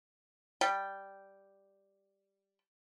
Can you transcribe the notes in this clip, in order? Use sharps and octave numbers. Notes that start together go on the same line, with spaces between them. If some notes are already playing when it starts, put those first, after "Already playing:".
G3 G5